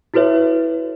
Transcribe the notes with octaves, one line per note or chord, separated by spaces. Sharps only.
E4 F#4 A4 B4 C#5 E5